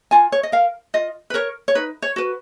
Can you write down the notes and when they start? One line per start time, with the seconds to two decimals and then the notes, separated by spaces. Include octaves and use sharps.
0.11 F4 G#5
0.32 C#5
0.43 D#5
0.52 A#4 F5
0.94 F4 D#5
1.30 B4
1.34 A#4 C#5
1.68 C#5
1.75 D#4 B4
2.02 C#5
2.16 F#4 B4